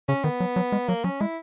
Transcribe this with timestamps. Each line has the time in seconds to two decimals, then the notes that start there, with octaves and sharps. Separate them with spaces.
0.09 C#3 C#4
0.24 D#3 B3
0.40 F#3
0.56 F#3
0.72 G#3
0.89 F#3 A#3
1.04 F#3 C#4
1.21 G#3 E4